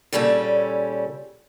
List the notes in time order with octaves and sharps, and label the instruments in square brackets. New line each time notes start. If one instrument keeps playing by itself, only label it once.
[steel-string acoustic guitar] A#2 C#3 G3 C#4 A4